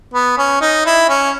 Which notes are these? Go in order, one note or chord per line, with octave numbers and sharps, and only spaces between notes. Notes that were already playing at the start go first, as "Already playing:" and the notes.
B3
C#4
D#4
E4
C#4